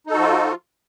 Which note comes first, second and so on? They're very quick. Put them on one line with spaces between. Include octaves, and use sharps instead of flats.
D#4 A4 F#4 F3 F4